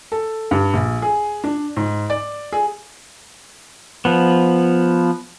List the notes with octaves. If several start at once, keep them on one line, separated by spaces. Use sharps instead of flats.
A4
G2
A#1
G#4
D4
G#2
D5
G#4
F3 B3